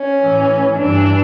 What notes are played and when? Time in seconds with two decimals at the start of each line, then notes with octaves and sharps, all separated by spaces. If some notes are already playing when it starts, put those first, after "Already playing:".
Already playing: C#4
0.20 A2 E3
0.76 G2 E3 D4